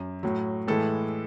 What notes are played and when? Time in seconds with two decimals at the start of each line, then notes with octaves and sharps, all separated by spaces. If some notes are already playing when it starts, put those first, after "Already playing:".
Already playing: F#2
0.23 A2 F#3
0.68 A2 E3 G#3 A4